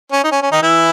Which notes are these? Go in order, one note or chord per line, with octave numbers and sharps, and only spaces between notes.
C#4
D#4
C#4
C#4
D#3 D#4
E3 E4